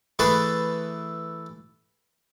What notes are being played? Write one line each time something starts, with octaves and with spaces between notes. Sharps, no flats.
E3 A3 E4 G#4 A4 B4